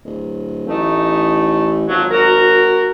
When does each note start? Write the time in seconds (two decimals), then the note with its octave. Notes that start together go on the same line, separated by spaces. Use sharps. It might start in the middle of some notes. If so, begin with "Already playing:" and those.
0.04 D1
0.67 A1 A3 D#4
1.88 G#1 F3 F#3
2.11 F#4 A#4